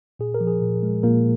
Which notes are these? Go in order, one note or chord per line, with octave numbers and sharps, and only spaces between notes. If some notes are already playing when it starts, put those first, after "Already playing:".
A#2 G#4
A#4
F3
G#4
A#2
G#3
A#2 A#3 A#4